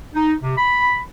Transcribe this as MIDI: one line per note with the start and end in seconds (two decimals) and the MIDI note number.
0.14 0.32 63
0.42 0.56 48
0.58 0.98 83